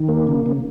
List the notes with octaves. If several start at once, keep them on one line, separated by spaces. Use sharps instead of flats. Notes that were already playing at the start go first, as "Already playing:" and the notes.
Already playing: D#3
A#3
C#3
C#3